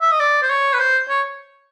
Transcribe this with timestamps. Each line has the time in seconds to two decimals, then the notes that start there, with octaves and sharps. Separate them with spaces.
0.01 E5
0.11 D#5
0.20 D5
0.42 C5
0.50 C#5
0.73 B4
0.79 C5
1.09 C#5